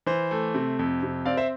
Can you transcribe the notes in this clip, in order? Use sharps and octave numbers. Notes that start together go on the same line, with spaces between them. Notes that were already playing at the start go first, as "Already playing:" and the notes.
E3 C5
A3
C3
F2
C3
C4 D5 F5
C5 E5